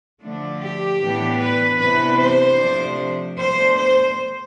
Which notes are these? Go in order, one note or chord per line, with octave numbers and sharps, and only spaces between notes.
D3 F3 A3 D4
G4
A2 E3 B3 D4
B4
C3 E3 B3 D4 B4
C5
C3 F3 A3 D4
B2 A3 D4 C5
C5